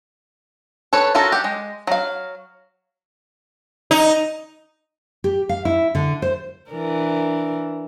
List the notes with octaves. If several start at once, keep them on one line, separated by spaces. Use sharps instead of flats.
A4 B4 C#5
C#4 F4 F#4 A4 A#4
G4 F#5
G#3
F#3 F5
D#4
G4
F5
E4
D3
C5
E3 D4 A#4